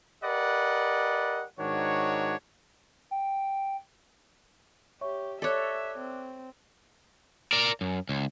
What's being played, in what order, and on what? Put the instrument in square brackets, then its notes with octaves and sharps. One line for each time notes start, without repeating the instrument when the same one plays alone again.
[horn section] G4 A#4 B4 D5 D#5 F#5
G#2 D#3 D4 F#4 C#5
[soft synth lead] G5
[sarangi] G4 [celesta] C#5 E5 C#6
[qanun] A4 C#5 [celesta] D5 D6 F#6 [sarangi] E5
[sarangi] C4
[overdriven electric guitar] A#4 D5
F#2
C#2